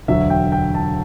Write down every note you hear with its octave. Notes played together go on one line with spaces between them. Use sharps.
E1 D2 D3 F#3 E5
G5
G5
A5